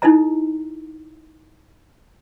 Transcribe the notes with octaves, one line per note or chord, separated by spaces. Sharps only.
D#4 E4 A4 D#5 A#5